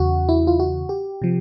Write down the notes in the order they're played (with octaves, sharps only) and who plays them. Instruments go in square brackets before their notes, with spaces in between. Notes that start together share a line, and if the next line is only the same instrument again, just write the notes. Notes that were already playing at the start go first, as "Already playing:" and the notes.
Already playing: [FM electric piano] E2 C#3 F#4
E4
F4
F#4
G4
C3 F3